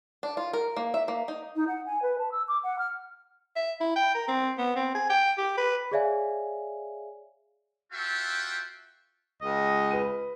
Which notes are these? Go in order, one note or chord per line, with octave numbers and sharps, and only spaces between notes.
D4
F4
A#4
A#3
E5
A#3
D#4
D#4
F#5
G#5
B4
A5
E6
D6
F#5
F6
E5
E4
G5
A#4
C4
B3
C4
G#5
G5
G4
B4
G#4 C#5 D5 E5 F5 G#5
F4 F#4 A4 E5 F5 G5
C#2 D#5
B4 D#7